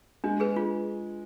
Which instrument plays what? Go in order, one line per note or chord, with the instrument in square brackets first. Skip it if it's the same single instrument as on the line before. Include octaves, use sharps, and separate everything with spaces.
[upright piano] G#3 [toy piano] D4
[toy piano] G#4 B4
F4